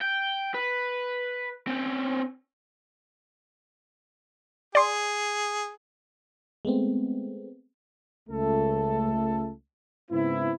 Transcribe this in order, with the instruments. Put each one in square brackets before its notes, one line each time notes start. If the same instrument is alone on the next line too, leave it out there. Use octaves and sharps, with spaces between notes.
[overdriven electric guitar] G5
B4
C4 C#4
[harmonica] G#4 [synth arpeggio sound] D5 C6
[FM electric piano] G#3 A3 B3 C4
[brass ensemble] C#2 A3 A4
G#2 C#3 B3 C4 E4